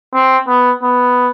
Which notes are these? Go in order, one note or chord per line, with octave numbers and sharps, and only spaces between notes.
C4
B3
B3